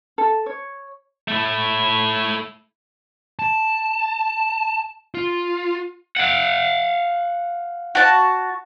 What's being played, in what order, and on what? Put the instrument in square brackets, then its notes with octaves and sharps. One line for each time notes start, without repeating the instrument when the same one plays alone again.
[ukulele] A4
C#5
[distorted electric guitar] A3 E4
[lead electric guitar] A5
F4
[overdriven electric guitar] F5 F#5
[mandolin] F#4 A5